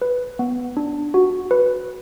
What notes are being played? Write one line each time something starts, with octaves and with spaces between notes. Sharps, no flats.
B4
B3
D4
F#4
B4